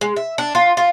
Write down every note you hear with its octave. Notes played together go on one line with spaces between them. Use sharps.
G#3
E5
D4
F4
F4